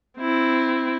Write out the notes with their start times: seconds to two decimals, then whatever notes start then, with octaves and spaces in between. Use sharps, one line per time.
0.18 C4 E4